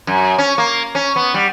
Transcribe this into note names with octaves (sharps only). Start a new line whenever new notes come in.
F#2
C#4
A#3
C#4
B3
G3